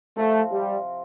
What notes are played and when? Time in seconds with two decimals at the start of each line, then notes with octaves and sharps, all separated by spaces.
0.16 C3 F3 A3 C4
0.51 G3